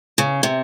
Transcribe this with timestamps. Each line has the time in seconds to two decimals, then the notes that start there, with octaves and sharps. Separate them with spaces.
0.18 C#3
0.43 C3